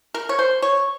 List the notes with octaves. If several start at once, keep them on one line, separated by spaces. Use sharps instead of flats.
A#4
C#5
C5
C#5